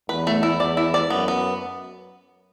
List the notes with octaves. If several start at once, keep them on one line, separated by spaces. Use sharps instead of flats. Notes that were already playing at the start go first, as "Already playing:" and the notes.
E2 B4
A3
E4
E2 D5
E4
D5
F#2 B3
B3